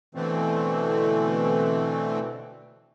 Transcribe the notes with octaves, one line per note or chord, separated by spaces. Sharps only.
B2 D3 E3 A3 C4